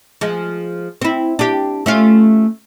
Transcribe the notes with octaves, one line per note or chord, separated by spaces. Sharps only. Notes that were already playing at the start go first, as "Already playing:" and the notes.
F3 G#3
C4 E4
D4 G4
A3 C#4 F4